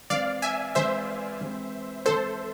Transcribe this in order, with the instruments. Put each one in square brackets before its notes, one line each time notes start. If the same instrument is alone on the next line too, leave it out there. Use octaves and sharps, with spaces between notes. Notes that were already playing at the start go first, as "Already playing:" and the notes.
[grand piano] E3 G#3 C4 [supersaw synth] D5 F5
[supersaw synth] E5 G#5
[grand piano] E3 G#3 C4 [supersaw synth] C5 E5
[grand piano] E3 G#3 C4
[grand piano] E3 G#3 C4 [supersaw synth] A4 C5